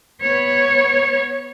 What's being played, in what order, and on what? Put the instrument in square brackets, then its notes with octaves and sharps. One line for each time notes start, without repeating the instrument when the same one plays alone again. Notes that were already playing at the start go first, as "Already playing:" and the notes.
[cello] B3 C#5